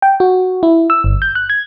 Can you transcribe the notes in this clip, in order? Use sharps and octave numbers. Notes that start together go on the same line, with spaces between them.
G5
F#4
E4
E6
G1
G6
F#6
G#6